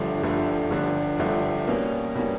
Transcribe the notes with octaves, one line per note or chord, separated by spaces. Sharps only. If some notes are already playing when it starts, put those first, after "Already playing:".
Already playing: G1 G2 D3 F3 A3
G1 G2 D3 F3 A3
G1 G2 D3 F3 A3
G1 G2 D3 F3 A3
B2 G3 A#3 C#4
B2 G3 A#3 C#4